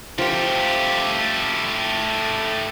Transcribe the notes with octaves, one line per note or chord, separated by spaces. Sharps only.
F3 A3 G4 G5